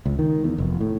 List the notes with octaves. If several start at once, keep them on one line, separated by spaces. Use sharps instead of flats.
C#2
D#3
E2
F1
A2